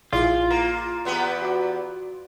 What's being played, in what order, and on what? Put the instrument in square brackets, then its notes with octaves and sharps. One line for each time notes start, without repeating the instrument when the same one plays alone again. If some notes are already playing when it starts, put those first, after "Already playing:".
[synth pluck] A#1 E4 G#4 [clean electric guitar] F4 [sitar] D5
[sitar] A#3 [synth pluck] A#5
[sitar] E2 B3 G4
[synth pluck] F#4 D5